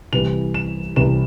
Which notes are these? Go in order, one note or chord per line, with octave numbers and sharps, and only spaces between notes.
C2 C3 E3 G3 F7
E7
C2 C3 E3 G3 E7